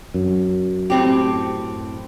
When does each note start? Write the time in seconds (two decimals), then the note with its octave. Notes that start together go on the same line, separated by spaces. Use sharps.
0.14 F#2
0.90 A2 C4 G4